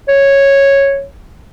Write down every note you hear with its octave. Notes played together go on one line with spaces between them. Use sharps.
C#5